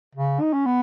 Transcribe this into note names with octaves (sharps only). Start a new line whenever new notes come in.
C#3
D#4
C#4
B3